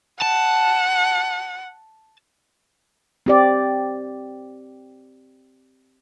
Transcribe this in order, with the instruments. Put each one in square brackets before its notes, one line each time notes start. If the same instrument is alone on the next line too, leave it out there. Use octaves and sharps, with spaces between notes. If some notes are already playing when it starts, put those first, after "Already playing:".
[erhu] F#5 [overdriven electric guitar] A5
[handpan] C4 G4 D5